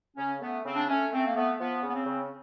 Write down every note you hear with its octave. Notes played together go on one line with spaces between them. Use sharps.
C#3 C#4
A3 B3
C#3 C4
D4
A3 C#4
A3 C4
A#3
A3 B3
F3 B3
C#3
B3
C4
C#3